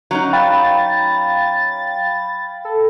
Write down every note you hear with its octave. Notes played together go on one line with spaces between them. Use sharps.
F#3 C#4 D#4
F5 G5 B5 A6
A4